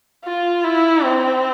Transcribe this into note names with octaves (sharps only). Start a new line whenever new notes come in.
F4
E4
C4